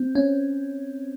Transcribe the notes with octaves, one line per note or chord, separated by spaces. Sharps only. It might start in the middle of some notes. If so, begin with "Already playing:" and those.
Already playing: C4
C#4